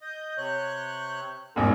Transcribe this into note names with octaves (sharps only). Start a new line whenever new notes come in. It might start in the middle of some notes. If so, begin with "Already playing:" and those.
D#5 G6
C3 C#5 F#6
E1 A1 G#2 F#3 F4 A#4